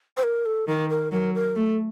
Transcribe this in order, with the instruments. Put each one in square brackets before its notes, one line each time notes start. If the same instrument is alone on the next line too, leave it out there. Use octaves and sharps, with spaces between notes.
[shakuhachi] C5
A#4
A4
[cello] D#3 [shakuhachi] A#4
[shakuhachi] A#4
[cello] F#3 [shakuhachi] A#4
[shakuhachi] A#4
[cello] A3 [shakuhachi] A4